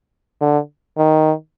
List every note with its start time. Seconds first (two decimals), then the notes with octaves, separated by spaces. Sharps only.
0.41 D3
0.98 D#3